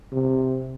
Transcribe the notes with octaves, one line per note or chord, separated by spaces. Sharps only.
C3